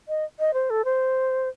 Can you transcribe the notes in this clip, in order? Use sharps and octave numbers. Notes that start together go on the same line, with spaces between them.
D#5
D#5
C5
A4
C5